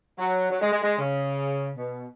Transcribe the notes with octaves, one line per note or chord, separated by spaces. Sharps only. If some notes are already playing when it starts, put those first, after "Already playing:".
F#3
F#3
G#3
G#3
G#3
C#3
B2